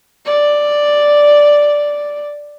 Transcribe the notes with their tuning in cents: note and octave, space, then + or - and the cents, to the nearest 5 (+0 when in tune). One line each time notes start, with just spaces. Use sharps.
D5 +0